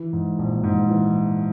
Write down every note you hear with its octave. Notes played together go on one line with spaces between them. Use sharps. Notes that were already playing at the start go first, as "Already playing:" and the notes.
Already playing: E3
G#2
A#1
G#2
E3